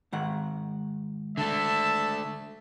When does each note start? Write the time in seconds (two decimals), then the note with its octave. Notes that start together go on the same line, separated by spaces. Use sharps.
0.13 G#2 D#3 F#5
1.37 D3 A3 E5 A5